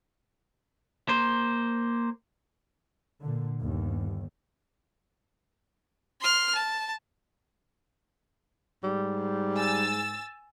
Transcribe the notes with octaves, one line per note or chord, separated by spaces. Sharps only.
A#3 C5
A#2 D3
G1 D#2
C6 F6
A5
G#2 G3
G#5 E6 A6